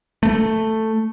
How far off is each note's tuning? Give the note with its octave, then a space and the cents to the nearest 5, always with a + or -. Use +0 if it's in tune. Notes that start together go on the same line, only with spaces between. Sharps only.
A3 +5